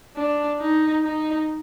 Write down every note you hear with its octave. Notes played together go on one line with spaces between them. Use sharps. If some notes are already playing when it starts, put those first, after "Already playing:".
D4
D#4
D#4